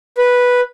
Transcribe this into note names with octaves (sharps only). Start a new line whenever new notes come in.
B4